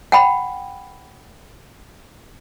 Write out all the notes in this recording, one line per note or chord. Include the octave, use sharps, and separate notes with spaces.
F#5 G5 B5